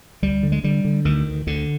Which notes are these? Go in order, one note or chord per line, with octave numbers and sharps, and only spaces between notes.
D2 G3
D3
G#3
D3 G3
D3
D2 D#3
D2
D2 D3